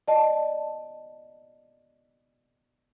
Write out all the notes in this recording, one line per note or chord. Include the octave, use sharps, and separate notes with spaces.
D5 D#5 A5